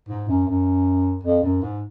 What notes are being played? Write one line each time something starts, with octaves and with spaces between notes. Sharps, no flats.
G#2
F#2
F#2
F2
F#2
G#2